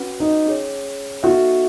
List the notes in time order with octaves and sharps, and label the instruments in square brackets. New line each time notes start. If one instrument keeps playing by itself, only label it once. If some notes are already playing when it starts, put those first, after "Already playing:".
Already playing: [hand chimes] C#4 F#4 B4 F#5
[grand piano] D#4
[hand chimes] C#4 G#4 C#5
[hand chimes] B3 D#4 A4 E5 [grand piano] F#4